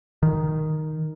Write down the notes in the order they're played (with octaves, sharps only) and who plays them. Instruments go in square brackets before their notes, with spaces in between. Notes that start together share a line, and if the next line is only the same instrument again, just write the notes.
[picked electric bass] D#3